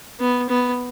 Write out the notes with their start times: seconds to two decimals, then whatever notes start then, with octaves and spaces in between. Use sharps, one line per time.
0.20 B3
0.49 B3